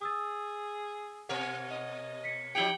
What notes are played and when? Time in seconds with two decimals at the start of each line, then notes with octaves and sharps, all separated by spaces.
0.01 G#4 D#6 E6 A6
1.29 B2 A#4 C#5 F#5
1.71 D#5
2.24 B6 C#7
2.55 F3 D#4 G4 G5 C#7 F#7 G7